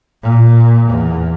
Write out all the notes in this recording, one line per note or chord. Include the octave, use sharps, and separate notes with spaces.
A#2
E2